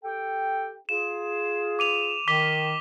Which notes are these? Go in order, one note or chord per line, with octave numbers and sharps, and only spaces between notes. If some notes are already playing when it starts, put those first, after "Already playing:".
G4 A4 G5
F4 G#4 E7
D6 D#7 F7
D#3 D6 B6 G7